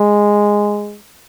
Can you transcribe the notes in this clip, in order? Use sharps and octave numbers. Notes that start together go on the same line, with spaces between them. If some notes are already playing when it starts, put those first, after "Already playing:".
Already playing: G#3